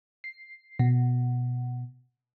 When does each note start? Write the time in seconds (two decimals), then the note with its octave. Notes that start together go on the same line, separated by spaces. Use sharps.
0.24 C7
0.79 B2